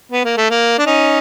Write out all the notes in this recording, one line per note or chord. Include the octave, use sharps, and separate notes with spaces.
B3
A#3
A3
A#3
D4
C#4 D#4